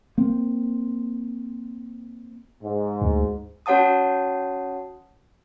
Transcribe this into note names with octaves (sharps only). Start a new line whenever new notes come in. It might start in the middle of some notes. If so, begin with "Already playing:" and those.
A#3 C4
G#2
D2
C#4 F#4 C#5 F#5 A5 D#6